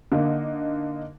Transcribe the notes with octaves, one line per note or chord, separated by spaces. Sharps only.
D3 A#3 D#4